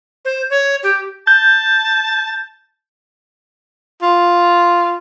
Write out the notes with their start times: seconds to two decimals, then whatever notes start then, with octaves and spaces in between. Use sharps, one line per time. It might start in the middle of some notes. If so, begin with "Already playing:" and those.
0.25 C5
0.50 C#5
0.83 G4
1.27 A5 G6
4.02 F4